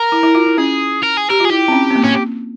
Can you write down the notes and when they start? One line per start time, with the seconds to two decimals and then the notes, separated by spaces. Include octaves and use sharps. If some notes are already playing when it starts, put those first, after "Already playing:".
Already playing: A#4
0.12 E4
0.23 E4
0.35 F4
0.46 E4
0.58 C#4 G#4
1.03 A#4
1.17 G#4
1.30 G4 A#4
1.40 F4
1.45 G#4
1.50 E4 G4
1.68 C4
1.72 C#4
1.90 C4
1.96 A#3
2.04 C#4